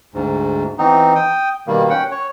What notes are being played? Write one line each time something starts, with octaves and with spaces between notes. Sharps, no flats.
D2 G#2
E3 B3 C4 D#4
G5 D#6
B2 D#3 G3 A#3
C#4 F#5 G5
C#5